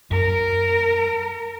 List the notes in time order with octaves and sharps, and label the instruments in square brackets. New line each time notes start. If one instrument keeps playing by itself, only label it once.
[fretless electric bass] F#2 [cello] A#4